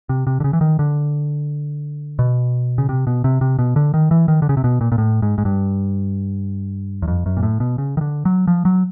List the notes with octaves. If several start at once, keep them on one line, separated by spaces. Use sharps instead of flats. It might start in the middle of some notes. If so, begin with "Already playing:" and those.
C3
C3
D3
C#3
E3
D#3
D3
B2
C#3
C3
B2
C3
C3
B2
D3
D#3
E3
D#3
D3
C#3
C3
B2
A#2
A#2
A2
G#2
G#2
G2
E2
F2
F#2
A#2
A2
B2
C#3
D#3
D3
F#3
F3
F#3